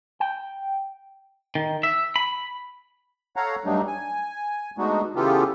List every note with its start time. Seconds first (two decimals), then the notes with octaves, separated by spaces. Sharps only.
0.20 G5
1.55 D#3
1.83 E5
2.16 B5
3.36 A4 C#5 F5 F#5 A#5
3.65 G2 F#3 G3 A3 D4 D#4
3.87 G#5
4.78 G#3 A3 B3 D4 D#4 F#4
5.15 C#3 E3 B3 F4 G4 A4